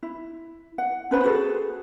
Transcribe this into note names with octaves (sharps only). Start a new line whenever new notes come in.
E4
F#5
C#4 B4 C5 B5
F#4 G#4 A4